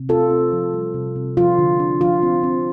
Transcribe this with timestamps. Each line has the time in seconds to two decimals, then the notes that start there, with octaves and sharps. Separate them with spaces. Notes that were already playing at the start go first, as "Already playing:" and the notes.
Already playing: C3
0.09 C4 F4 A4
0.30 C4
0.52 F3
0.74 G3
0.94 C3
1.16 C3
1.37 F3 F4
1.58 D3
1.80 D4
2.01 F3 F4
2.23 C4
2.43 C4